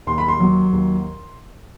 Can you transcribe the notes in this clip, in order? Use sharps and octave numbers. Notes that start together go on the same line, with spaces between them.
D#2 C6
B5
C6
F#3
D#2